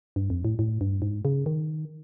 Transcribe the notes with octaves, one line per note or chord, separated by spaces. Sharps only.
G2
F2
A2
A2
G2
G#2
C#3
D#3